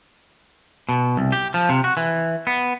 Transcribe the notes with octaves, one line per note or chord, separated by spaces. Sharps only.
B2
C2
G4
F3
C3
F#4
E3
B3